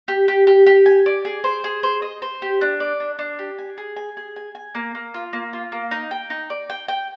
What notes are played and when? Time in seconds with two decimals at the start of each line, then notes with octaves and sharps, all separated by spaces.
0.08 G4
0.28 G4
0.47 G4
0.66 G4
0.86 G#5
1.06 D5
1.25 G#4
1.44 C5
1.64 G#4
1.83 C5
2.02 D#5
2.22 C5
2.42 G4
2.61 D4
2.80 D5
3.00 D4
3.19 D4
3.39 G4
3.58 G#5
3.78 G#4
3.97 G#5
4.17 G#4
4.36 G#5
4.55 G#5
4.75 A#3
4.95 A#3
5.14 F4
5.33 A#3
5.53 F4
5.72 A#3
5.91 D#4
6.11 G5
6.30 D#4
6.50 D5
6.70 G5
6.88 G5